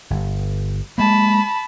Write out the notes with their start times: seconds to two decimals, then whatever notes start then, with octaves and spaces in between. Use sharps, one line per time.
0.10 G1
0.98 G#3 A#3 A5 B5